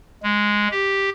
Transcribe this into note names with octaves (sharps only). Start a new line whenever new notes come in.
G#3
G4